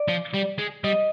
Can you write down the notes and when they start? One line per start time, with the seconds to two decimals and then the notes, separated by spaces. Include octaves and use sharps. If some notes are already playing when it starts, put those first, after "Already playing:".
Already playing: D5
0.08 F3
0.34 G3
0.59 G#3
0.84 G3 D#5